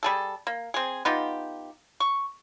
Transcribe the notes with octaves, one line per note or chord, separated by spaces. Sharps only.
G3 G#4 A4
A#3
C4 G#4
B3 D#4 F4 G4
C#6